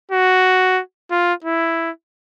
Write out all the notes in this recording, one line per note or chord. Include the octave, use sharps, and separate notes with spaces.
F#4
F4
E4